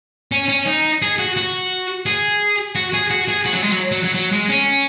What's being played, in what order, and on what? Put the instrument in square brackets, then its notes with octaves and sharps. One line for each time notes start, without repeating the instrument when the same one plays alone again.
[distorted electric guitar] C#4
C#4
D#4
G#4
F#4
F#4
G#4
F#4
G#4
F#4
G#4
F#4
F#3
G#3
F#3
F#3
F#3
F#3
G#3
C#4